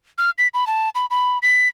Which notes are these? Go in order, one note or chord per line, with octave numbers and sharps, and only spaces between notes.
F6
B6
B5
A5
B5
B5
B6